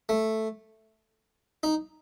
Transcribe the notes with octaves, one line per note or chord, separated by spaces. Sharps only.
A3
D#4